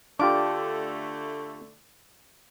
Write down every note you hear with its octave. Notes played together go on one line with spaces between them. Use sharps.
D3 A3 D4 F4 G4 D6